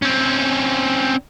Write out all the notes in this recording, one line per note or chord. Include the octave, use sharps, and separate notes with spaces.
C4 C#4